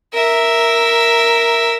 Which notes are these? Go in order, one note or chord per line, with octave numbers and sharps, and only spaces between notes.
A#4 E5